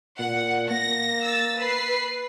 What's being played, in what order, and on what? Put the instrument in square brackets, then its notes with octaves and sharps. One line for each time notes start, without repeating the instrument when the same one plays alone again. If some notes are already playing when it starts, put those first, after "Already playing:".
[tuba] A#2 [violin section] F#5
[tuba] A#3 [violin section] A#6
[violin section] E6 A6
B4 C7